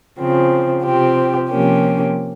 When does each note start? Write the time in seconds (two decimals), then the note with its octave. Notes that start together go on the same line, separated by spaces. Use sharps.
0.18 C#3 F3 C4
0.84 C3 F3 C4 G4
1.50 C3 F3 A#3 C#4 G4